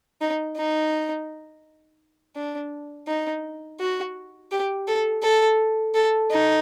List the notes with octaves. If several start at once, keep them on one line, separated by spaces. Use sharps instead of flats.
D#4
D#4
D4
D#4
F#4
G4
A4
A4
A4
D#4